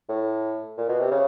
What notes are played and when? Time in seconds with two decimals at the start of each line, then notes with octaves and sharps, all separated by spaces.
0.09 A2
0.77 A#2
0.89 B2
1.00 C3
1.11 C#3